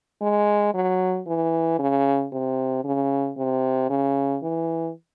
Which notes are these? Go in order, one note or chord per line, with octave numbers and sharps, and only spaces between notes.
G#3
F#3
E3
C#3
C3
C#3
C3
C#3
E3